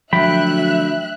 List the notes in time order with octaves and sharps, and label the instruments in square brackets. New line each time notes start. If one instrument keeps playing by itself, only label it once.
[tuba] D2 [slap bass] F3 F#3 [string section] E5 F#6 [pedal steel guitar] G5 B5